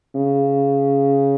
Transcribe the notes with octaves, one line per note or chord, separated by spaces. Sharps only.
C#3